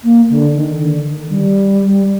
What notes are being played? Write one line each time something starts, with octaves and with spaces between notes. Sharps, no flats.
A#3
D3
D#3
D3
D#3
G3